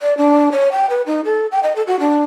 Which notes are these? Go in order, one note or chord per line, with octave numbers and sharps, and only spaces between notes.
D5
D4
C#5
G5
B4
D#4
A4
G5
D#5
A4
F#4
D4